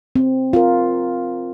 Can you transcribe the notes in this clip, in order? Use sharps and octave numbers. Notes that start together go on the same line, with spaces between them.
C4
F4 A#4